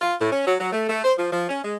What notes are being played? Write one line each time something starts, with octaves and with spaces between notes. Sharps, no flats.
F4
A2
C#4
F#3
F#3
A3
A3
C5
F3
F3
C#4
G#3